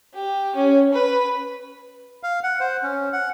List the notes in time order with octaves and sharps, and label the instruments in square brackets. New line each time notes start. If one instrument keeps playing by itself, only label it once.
[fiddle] G4
C#4
B4
[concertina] F5
F#5
C5
C#4
F#5